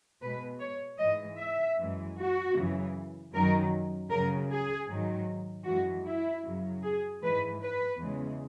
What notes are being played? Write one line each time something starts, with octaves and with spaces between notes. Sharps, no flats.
B2 G#3 B4
C#5
G#2 E3 G#3 D#5
E5
F#2 E3 G#3
F#4
F#2 C#3 E3
F#2 D#3 F#3 A#4
F#2 C#3 F#3 A#4
G#4
G#2 D#3 F#3
F#2 E3 G#3 F#4
E4
F#2 C#3 F#3
G#4
G#2 E3 G#3 B4
B4
E2 C#3 G#3